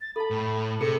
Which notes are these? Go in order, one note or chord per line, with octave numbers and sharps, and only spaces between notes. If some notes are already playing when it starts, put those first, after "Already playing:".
A6
A4 A5 B5
A2
C3 G#4 A4 C#7